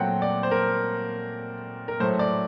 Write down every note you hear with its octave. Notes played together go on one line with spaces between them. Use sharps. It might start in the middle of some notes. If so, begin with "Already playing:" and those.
Already playing: A#2 F#3 A3 C4 F#5 G5
D5
C5
A#4
A#4
A2 F#3 A3 C5
D5